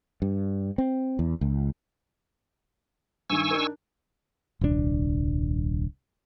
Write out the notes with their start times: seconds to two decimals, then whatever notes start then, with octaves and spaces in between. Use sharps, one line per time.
0.22 G2
0.78 C4
1.19 E2
1.41 C#2
3.30 G2 D#3 G#5 C#6 E6
3.51 D4 D#4 A#4
4.61 D#1 C2 D3 D4